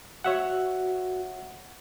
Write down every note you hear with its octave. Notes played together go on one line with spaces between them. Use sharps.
F#4 C#5 E5 F#5